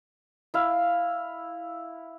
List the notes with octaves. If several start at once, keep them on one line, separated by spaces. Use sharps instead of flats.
E4 F5